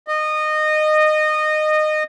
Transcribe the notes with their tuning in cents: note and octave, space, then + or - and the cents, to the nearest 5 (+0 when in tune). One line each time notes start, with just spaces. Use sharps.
D#5 -20